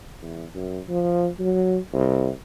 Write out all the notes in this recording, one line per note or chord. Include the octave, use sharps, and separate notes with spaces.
E2
F#2
F3
F#3
C2